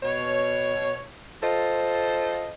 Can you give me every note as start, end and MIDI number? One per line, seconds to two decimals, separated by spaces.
0.03 1.03 47
0.03 1.03 73
1.43 2.53 65
1.43 2.53 69
1.43 2.53 72
1.43 2.53 75